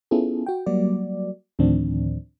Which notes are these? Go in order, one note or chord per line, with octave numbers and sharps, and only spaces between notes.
B3 C#4 E4 F4 G#4 A4
F#4 G5
F#3 G3 A#3 F#4 D5
D2 A2 D#3 F3 C4 D4